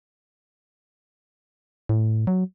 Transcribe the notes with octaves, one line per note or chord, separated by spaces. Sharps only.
A2
F#3